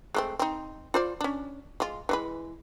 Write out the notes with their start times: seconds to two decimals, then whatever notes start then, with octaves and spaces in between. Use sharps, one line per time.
0.14 G#3 A3 C4
0.39 C4 D#4
0.94 F4 C5 D5
1.21 C#4 D4
1.80 G#3 F4
2.09 E3 G#3 B4